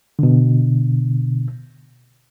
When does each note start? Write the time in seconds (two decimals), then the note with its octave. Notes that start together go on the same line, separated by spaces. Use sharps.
0.19 B2 D3